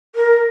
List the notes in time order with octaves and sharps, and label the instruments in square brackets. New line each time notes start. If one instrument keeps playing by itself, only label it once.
[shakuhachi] A#4